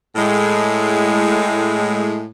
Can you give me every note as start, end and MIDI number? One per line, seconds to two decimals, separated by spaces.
0.16 2.28 45
0.16 2.28 56